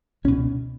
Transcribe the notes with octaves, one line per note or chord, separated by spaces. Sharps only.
C#2 B2 C#4